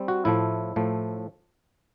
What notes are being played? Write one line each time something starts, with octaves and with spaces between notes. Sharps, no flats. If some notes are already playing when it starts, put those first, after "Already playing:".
Already playing: G3 C4
F#4
A2 F3 A3 E4
A2 F3 A3